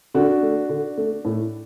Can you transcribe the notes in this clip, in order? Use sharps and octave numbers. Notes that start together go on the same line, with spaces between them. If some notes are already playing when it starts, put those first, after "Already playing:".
D3 D4 F#4
A3
D3
A3
A2